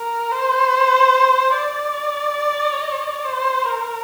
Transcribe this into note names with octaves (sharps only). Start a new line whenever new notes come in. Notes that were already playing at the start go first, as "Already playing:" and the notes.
Already playing: A#4
C5
D5
C5
A#4